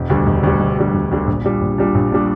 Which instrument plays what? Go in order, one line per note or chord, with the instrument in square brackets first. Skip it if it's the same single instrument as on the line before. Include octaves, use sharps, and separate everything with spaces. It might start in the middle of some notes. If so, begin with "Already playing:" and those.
Already playing: [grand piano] E1
D2 D3 G3
E1
D2 D3 G3
E1
D2 D3 G3
E1
D2 D3 G3
A#1
A#2 G3 D4
A#1
A#2 G3 D4
A#1
A#2 G3 D4